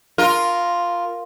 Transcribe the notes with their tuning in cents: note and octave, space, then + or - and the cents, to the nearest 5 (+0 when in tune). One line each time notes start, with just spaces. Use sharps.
F4 +0 A#4 +0